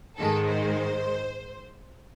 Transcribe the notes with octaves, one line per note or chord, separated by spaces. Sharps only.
G#2 D#3 G#3 A4
C5